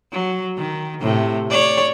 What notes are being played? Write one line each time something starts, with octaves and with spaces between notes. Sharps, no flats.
F#3
D#3
A2 C3
C#5 D5